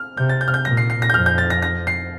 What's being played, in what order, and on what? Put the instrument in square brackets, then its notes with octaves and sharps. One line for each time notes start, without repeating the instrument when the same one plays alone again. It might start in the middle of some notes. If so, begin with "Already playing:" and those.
Already playing: [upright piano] F6
[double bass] C3 [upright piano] G6
[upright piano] A6
G6
F6
G6
[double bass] A#2 [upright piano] A#6
[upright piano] C7
C7
A#6
G6
[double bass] F2 [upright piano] F6
[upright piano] G6
A6
A#6
A#6
C7